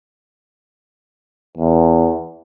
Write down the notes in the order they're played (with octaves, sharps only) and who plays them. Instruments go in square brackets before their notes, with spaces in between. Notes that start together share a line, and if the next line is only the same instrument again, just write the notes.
[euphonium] E2